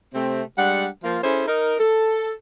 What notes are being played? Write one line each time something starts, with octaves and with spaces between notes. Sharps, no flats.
C3 A3 C4
G3 G#3 D4 F#5
F3 A#3 F4
C#4 E4 G#4 A4 C5
D#4 A#4
A4